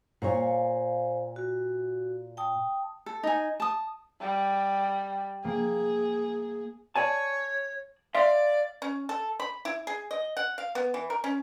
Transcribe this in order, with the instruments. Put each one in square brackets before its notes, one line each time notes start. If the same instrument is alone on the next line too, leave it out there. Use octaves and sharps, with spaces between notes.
[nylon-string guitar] A#2 C#5 [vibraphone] C5 F5 G#5
[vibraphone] F#4
G5 A5 D#6
[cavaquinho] A4
D#4 G#5
A5 D#6
[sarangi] G3
[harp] A#3 [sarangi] G#4
[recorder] C#5 [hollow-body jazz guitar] D5 G#5 A5
[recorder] D5 [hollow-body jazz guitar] E5 F5 C6
[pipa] C#4
A4
B5
E4
G#4
D#5
F#5
F5
B3
E3
A#4
C#4